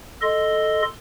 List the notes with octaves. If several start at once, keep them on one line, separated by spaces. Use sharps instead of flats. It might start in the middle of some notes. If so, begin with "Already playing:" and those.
A4 D#5 C6